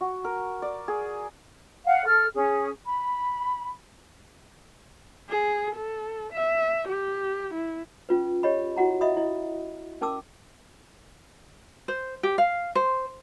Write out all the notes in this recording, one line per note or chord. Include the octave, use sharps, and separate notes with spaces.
F#4
A#4
D5
G#4
F5 F#5
A4 F6
C#4 G#4
B5
G#4
A4
E5
G4
E4
C#4 F4 B4
G4 C#5 D#5 B5
E4 F#4 F#5 A#5
D#5 E5 B5 D#6
E4 D#5
C#4 A#4 A5 D6 E6
C5
G4
F5
C5